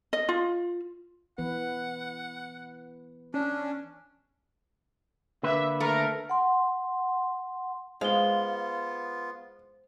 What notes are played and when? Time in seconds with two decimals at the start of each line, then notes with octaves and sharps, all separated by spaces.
0.13 D#5
0.29 F4
1.38 E3 B3 B4 F#5
3.34 C#4 D4
5.43 D3 A#3 B4 E5
5.80 A3 A#4
6.30 F#5 C6
8.01 G#3 B3 F4 C5 F5 G7